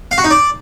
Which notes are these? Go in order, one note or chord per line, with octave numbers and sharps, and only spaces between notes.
F5
F#4
D#4
D5